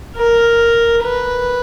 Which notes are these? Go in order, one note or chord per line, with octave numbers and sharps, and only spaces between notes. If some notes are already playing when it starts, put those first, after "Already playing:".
A#4
B4